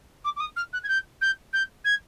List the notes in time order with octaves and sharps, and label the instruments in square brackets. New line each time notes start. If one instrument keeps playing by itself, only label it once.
[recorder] D6
D6
D#6
F6
F#6
G#6
G6
G6
G6
G#6